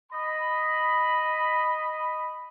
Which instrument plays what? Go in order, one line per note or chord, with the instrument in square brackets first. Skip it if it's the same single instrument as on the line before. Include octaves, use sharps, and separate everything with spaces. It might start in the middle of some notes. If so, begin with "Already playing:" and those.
[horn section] D#5 B5